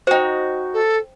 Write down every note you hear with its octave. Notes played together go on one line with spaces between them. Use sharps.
D#4 F#4 C5 G5
A4